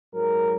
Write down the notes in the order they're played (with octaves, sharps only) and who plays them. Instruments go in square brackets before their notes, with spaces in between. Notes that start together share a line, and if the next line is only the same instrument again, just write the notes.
[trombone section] G#2 F#3 A#4